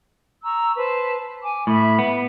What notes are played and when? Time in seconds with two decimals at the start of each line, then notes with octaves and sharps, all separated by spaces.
0.44 A#5 C#6 E6
0.76 B4 C5 A5
1.42 G#5 D6
1.67 A2 E5 B5
1.99 B3